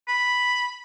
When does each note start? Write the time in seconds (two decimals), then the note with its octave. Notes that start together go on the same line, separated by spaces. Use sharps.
0.08 B5